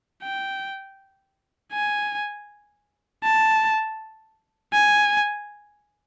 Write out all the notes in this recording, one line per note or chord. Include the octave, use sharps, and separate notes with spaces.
G5
G#5
A5
G#5